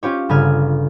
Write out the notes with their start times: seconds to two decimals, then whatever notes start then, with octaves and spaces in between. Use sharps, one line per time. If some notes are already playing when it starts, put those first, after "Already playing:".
0.03 C#4 F4 G4 C#5
0.29 G1 C#3 G#5 F6